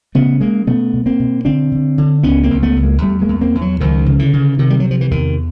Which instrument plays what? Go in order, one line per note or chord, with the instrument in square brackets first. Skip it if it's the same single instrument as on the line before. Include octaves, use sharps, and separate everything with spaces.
[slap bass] C#3 A3 B3
C#3 G#3 A#3
B2 A3 B3
B2
A#3 C4
B2
D3 C4 D4
D3
D3
C#2 B3 C#4
A#3 C4
C#2
A3 B3
C#2
G#3 A#3
E2 G3 A3
G#3 A#3
E2
A#3 C4
E2
E3 F#3
C#2 D#3 F3
C#3
D3 E3
C#3
C3 D#3
G3
C3 F#3
F3
E3
E2 D#3